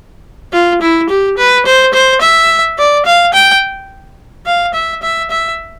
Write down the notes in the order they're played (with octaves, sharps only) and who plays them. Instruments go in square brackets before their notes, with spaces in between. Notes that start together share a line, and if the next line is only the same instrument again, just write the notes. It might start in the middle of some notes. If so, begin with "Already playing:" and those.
[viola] F4
E4
G4
B4
C5
C5
E5
D5
F5
G5
F5
E5
E5
E5